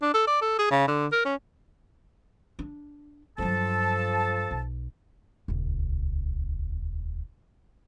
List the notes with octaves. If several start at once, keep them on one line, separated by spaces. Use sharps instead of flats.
D4
A4
D5
A4
G#4
C#3
D3
A#4
C#4
D4
G2 F3 F#3 A4 A5
B1
D#1 C#2